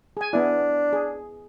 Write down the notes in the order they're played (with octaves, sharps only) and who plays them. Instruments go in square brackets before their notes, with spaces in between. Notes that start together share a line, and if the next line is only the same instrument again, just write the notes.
[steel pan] G#4 G#5
[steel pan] B3 E4 [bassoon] D4
[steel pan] G#4